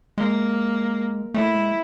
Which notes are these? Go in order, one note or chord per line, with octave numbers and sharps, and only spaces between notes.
G#3 A#3
A3 E4
G#3